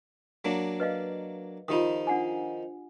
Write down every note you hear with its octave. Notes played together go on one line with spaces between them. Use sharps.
F#3 A#3 D4
B4 D#5 F5
D#3 F3 D#4 F4 G4 D#6
D4 F#5 G#5